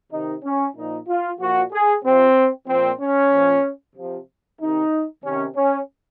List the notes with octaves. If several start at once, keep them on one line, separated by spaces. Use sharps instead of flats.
C3 D#3 D#4
C#4
A#2 F3 D#4
F4
A#2 F3 F#4
G#4
C3 F3 C4
A#2 F3 C4
C#4
A#2 F3
C3 F3
C3 D#3 D#4
C3 D#3 C#4
C#4